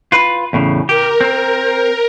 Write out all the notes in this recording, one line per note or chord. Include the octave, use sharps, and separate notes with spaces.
F4 B4
E2 A2 C#3
G4 A#4
C4